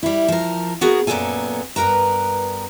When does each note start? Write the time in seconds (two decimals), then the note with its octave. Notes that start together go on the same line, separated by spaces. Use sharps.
0.03 G3 E4
0.28 F3 A#4
0.81 B3 F#4 G#4 A#4
1.07 F#2 A#2 A#3 B3 A4 G#5
1.76 G2 B3 A#4 B4 A#5